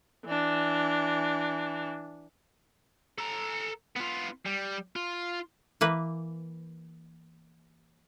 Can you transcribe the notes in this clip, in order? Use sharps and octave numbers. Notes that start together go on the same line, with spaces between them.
E3 D4
A4 A#5
B3 F4
G3
F4
E3 A#3 B4